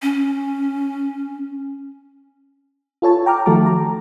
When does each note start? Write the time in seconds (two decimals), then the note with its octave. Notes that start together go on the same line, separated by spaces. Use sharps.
0.02 C#4
3.02 F4 A4 C#5 A5
3.26 G5 A#5 D6 F6
3.46 D#3 F3 A3 F#4 A5 D6
3.66 A#5